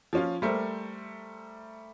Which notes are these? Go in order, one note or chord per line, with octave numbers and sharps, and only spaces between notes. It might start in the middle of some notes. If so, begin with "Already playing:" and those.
F3 C#4 F4
G3 A3 A#4 C5